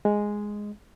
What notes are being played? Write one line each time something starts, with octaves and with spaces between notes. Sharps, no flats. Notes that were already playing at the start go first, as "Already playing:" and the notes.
G#3